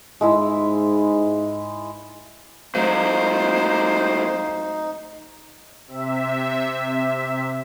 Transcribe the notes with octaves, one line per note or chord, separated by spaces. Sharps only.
G#2 G#3 E4 E6
G#2 F#3 A3 D#4 F#4 C5 F5
C3 E5